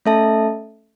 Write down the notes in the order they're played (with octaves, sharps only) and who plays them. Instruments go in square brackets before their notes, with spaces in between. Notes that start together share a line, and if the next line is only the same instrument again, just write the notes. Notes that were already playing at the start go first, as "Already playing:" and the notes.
[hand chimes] A3 C#4 A4 E5 A5